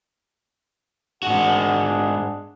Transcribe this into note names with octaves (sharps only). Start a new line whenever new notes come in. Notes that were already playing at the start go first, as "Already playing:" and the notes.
G#2 D4 F#4 G#4 F#5